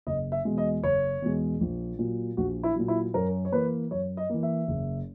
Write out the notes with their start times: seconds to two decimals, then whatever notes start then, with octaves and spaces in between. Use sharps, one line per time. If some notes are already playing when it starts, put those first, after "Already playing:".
0.07 F#1 D#5
0.32 E5
0.45 E2 B2 G#3
0.58 D#5
0.83 F#1 C#5
1.22 E2 B2 G#3
1.61 A#1
1.99 A#2 F#3
2.37 A#1 F#4
2.63 E4
2.76 A#2 F#3
2.88 E4
3.14 F#2 A#4
3.45 C#5
3.52 E3 A#3 B4
3.91 F#2 C#5
4.17 D#5
4.29 E3 A#3
4.43 E5
4.68 F#1